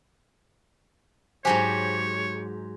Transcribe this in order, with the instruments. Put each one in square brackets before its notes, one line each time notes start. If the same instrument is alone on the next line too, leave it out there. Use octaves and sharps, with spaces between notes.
[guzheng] G#2 F#3 G4 [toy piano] C5 G#5 A5 [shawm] C#5